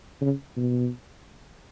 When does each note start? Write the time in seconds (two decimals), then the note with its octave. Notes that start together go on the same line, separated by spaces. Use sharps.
0.22 C#3
0.57 B2